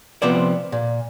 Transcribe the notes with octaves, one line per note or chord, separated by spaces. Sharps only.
C3 F3 B3 C5 D5
A#2